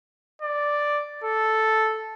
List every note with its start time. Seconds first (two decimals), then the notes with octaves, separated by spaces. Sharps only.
0.42 D5
1.25 A4